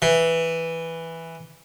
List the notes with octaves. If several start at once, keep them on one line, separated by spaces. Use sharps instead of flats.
E3